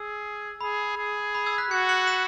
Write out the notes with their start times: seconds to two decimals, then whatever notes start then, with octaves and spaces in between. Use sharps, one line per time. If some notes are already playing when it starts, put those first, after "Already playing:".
Already playing: G#4 E6
0.61 G#4 B5
0.97 G#4
1.35 B5
1.46 E6 G#6
1.58 F#6 B6
1.70 F#4 G#6 C#7
1.89 C#7 F#7
2.01 C#7
2.07 B6 E7